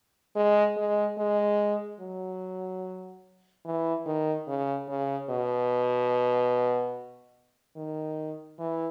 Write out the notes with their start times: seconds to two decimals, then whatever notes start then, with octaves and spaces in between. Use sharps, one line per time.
0.36 G#3
0.77 G#3
1.18 G#3
2.00 F#3
3.65 E3
4.06 D#3
4.48 C#3
4.89 C#3
5.30 B2
7.77 D#3
8.59 E3